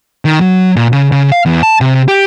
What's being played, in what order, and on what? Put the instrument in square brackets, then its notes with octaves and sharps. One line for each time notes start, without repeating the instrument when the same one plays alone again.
[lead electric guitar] D#3
F#3
A#2
C#3
C#3
F5
E2
A5
C3
G4